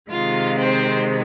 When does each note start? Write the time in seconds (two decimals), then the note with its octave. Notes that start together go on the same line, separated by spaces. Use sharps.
0.11 C3 D#3 G#3 F4 F5
0.57 C4 C5